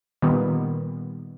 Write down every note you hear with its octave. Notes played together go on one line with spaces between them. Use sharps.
A#2 D#3 G3 B3